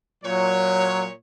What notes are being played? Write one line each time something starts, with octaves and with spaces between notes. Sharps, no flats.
A#2 F#3 C#5